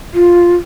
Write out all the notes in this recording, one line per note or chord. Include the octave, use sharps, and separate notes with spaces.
F4